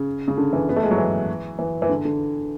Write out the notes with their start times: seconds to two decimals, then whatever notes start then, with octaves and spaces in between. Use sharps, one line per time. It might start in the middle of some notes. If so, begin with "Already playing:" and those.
Already playing: C#3
0.28 C#3
0.37 D3
0.53 E3
0.69 B3
0.76 A3
0.83 G#3
0.91 F#3
0.98 E3
1.59 E3
1.82 E3
1.89 D3
2.05 D3